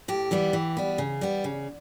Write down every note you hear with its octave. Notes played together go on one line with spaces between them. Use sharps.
A2 G4
E3 G3 B3
E3
G3 B3
C#3
G3 B3
C#3